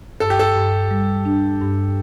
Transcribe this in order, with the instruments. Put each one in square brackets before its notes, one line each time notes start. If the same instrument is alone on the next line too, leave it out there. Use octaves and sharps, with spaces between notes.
[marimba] G2 [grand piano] A4
[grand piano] G4
A4
[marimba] G2
G3
D4
G2